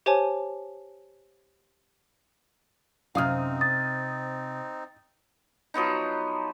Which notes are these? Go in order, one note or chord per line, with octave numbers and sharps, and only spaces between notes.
G4 C5 C#5 G#5 A5
F#2 C3 C4 D#4 F5 D#6 F6
D#6 A6
F3 F#3 B3 D#4